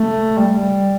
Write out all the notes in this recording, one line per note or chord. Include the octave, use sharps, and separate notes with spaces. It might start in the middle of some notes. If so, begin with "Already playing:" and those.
Already playing: A3
G3